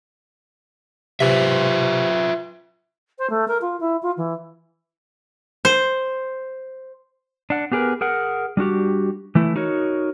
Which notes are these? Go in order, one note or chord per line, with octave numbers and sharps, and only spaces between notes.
C3 F4 B4 E5
C5
A3
A#4
F4
E4
F4
E3
C5
D4 F#5
B3 G4 G#4 A#4 B4
G#4 A#4 F#5
G3 D4 F#4 G4
E3 A3 E4
D#4 F#4 A#4 C#5